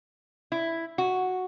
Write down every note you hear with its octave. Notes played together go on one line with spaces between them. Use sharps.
E4
F#4